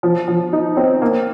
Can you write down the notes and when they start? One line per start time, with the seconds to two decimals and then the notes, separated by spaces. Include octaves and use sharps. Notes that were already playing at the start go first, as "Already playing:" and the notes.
0.03 F3
0.28 F3
0.53 D#4
0.77 C4
1.02 A#3